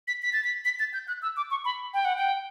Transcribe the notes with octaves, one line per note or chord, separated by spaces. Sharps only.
B6
B6
A6
B6
B6
A6
G6
F#6
E6
D6
C#6
B5
G5
F#5
G5